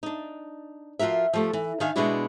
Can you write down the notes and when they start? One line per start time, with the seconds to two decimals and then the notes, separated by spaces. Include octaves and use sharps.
0.03 D4 D#4
0.99 F3 F4 F#4 A#4 E5
1.33 F3 A3 G4
1.53 E3
1.80 D#3 D4 D#4 E5 F5 G#5
1.96 B2 G#3 B3 D4 E4 F#4